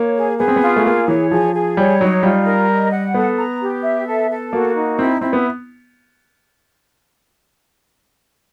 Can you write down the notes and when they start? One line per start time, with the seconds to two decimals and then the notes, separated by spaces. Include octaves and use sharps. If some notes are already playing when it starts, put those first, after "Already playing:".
Already playing: A#3 C#5
0.16 G#4
0.39 B3 G#4
0.48 C4
0.56 B3
0.62 F4
0.76 A3
0.86 A#3 G#4
1.08 E3 C#5
1.31 F3 G#4
1.54 G#4
1.77 G3 C#5
2.00 F#3 D#4
2.23 G3 F4
2.46 A#4
2.69 D#5
2.92 F#5
3.14 B3 A4
3.38 A#5
3.61 G4
3.84 E5
4.07 A4
4.30 A4
4.53 A#3 F#4
4.76 D#4
4.99 C4 E4
5.21 C4 E4
5.33 B3